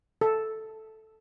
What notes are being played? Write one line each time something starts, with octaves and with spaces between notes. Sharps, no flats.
A4